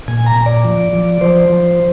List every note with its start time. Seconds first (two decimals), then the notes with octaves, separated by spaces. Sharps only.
0.08 A#2 G#5
0.26 A#5
0.36 A#2
0.46 D5
0.64 F3
0.93 F3
1.21 F3 C5
1.50 F3